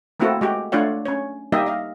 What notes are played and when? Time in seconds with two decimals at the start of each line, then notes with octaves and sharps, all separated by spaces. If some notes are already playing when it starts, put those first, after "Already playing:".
0.20 A3 A#3 C4 E4 F#4 A4
0.41 G#3 F#4 G4
0.72 A3 D4 F4 C#5 F#5
1.06 C#4 C#5
1.52 G3 A#3 D#4 G4 D#5 E5
1.66 D#5 F5